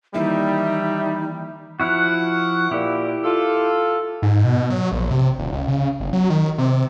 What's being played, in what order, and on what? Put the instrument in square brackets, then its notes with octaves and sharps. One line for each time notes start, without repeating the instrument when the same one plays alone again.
[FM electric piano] D#3 E3 A#3 [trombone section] G3 [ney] D#4 [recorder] E5
[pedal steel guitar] F3 E4 F#4 [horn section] F#5
[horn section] A#2 [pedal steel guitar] E4 G4
[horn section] F4 A4
[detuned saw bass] G#2
B2
F#3
A#1
C3
D#1
C#2
C#3
G1
F#3
D#3
C3